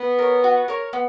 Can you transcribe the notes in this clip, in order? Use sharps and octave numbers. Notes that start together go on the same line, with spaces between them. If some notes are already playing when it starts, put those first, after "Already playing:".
Already playing: B3
A#4 C#5
F#4
A#4 C#5
B3